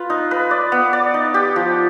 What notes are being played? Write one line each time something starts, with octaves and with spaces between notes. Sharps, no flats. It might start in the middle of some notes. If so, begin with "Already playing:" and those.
Already playing: F4 B4
D#4
B4
D5
B3
D5
D#4
G4
F3